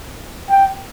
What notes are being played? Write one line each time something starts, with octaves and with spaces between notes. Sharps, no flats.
G5